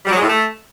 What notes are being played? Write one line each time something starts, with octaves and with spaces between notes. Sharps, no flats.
G3
F#3
G#3
A2
A3